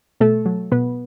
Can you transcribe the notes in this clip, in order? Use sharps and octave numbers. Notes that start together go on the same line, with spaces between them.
B2 A3 A4
F#3
B2 B3 B4